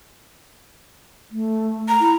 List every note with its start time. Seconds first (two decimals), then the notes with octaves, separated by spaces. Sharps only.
1.31 A3
1.88 A#5
2.01 E4